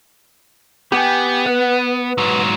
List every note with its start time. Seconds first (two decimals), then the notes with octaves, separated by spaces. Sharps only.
0.92 B3 G4 G5 G#5
1.46 B4 F#5
2.18 G#2 F#3